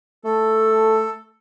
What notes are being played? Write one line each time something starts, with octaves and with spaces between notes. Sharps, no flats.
A3 A4